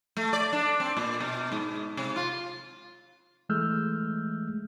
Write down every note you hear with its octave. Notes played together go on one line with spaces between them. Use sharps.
A3
D5
D4
C4
A#2
B2
G#2
C3
F4
E3 G#3 A3 E6 F6 G6